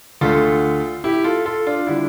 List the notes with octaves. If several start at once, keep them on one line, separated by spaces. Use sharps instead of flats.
D2 D3 A3 F4 A4
E4 G4
F4 A4
F4 A4
D4 F4
D3 G3 E4